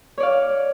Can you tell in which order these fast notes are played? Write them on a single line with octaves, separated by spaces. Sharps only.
C#5 D5 F5